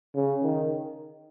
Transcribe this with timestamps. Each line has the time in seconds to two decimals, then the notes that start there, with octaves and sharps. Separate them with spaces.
0.15 C#3
0.43 D#3